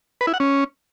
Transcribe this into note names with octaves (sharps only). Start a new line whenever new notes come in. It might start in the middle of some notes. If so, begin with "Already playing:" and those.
B4
E4
F#5
C#4